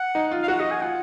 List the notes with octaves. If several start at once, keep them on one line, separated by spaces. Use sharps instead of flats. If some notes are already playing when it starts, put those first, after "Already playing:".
Already playing: F#5
D#4
F4
F5
F#4 F#5
F#4 D#5
G#5
F4 F#5